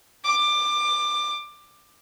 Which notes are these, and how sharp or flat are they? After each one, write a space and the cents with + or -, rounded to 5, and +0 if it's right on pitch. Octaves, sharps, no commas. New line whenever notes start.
D6 +20